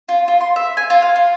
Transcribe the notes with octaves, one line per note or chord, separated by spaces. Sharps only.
F4
F4
C6
E5
G#5
F4
F5
F4